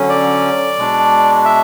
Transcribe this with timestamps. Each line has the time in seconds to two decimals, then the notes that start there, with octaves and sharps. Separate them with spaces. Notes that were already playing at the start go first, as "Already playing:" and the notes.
Already playing: D3 F#3 C#4
0.09 D5
0.77 B2 G#3 D4
1.45 E5